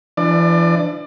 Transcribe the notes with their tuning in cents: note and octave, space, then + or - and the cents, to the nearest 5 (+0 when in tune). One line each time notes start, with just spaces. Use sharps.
E3 +35 D4 +0 D5 +30